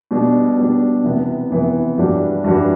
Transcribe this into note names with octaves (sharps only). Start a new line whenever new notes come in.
B2 G3 D4
B2 G3 D4
C3 E3 B3
C3 E3 B3
G2 E3 G3 D4 F#4
G2 E3 G3 D4 F#4